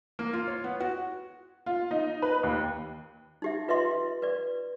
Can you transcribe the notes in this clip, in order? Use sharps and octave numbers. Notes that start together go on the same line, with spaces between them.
A#3
F4
C#5
B3
F#4
F4
D#4
B4
D#2
D#4 G4 E5
F4 B4 D#5 E5 C6
B4 D5